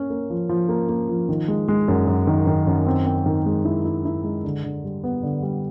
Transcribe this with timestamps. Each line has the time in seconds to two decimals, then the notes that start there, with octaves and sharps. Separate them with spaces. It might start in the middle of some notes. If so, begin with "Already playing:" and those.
Already playing: A#3 C#4
0.10 A#3
0.30 F3
0.49 F3
0.69 A#3
0.89 A#3
1.09 F3
1.29 D#3
1.48 G#3
1.68 G#3
1.88 F#2
2.08 F#2
2.27 D#3
2.47 D#3
2.67 F#2
2.87 C4
3.07 C4
3.26 D#3
3.46 G#3
3.65 E4
3.85 E4
4.05 E4
4.24 G#3
4.44 D3
4.64 D3
4.84 G3
5.04 B3
5.23 D3
5.43 G3